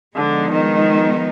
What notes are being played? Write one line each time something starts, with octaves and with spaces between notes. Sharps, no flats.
D3 F3 G#3 B3 D#4
D#3